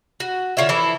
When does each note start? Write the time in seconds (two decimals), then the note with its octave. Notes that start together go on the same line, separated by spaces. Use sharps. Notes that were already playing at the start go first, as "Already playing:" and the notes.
0.20 F#4
0.57 D3 F4 C#5 E5
0.69 E3 F3 E4 A4